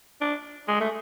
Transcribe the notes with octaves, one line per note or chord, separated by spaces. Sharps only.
D4
G#3
A3